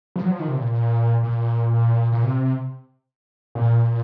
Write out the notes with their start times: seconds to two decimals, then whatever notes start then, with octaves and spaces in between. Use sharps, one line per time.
0.16 F3
0.24 F#3
0.31 F3
0.40 D#3
0.48 C3
0.57 A#2
1.23 A#2
2.12 A#2
2.23 C3
3.55 A#2